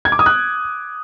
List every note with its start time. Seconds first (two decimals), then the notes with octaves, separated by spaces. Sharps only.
0.05 G#6
0.12 D6
0.19 D#6
0.26 F#6